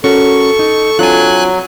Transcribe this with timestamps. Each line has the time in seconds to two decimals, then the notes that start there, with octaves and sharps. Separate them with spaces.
0.04 C#4 F#4 A4 A#4 C#6
0.59 D#4
0.99 F#3 C4 D4 F4 G#5 F#6